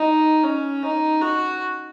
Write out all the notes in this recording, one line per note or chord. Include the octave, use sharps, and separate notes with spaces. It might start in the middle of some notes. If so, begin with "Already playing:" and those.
Already playing: D#4
C#4
D#4
F#4